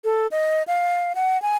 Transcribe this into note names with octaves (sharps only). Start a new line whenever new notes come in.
A4
D#5
F5
F#5
G#5